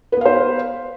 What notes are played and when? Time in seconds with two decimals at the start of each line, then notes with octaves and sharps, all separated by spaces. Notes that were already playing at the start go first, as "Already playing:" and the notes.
0.12 B4
0.17 B3
0.21 F5
0.25 C5